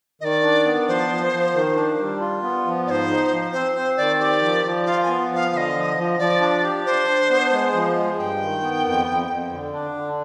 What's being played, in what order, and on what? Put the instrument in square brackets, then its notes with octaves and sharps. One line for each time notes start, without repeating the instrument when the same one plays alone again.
[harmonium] D#3 [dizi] D5 D#5
[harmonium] D4
B3
[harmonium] F3 [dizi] C5
[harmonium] F3
F3
D#3
D4
G3
F4
B3
F3
[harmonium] G#2 [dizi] C5 D5
[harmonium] D#4
F3
[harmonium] C4 [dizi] C5
[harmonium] C4 [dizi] C5
[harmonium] D#3 [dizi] D5
[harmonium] G4 [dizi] D5
[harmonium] F3
F3
[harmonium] F4 [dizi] F5
[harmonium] B3 [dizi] G#5
[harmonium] F3 [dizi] F5
[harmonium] D3 [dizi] D#5 F5
[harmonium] F3
F3
[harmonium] F3 [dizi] D5
[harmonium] D4
G4
[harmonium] D4 [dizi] C5
[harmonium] D4
B3
G#3
F3
G#3
[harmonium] G2 [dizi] G5
[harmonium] D#3
B3
F2
F2
F2
D3
D4
D3